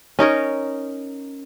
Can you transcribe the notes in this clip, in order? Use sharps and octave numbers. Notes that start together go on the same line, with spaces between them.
C#4 D#4 A#4 C#5